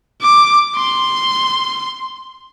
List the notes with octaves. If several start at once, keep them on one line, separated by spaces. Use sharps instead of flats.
D6
C6